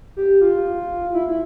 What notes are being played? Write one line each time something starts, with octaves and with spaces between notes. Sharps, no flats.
G4
F4
E4
E4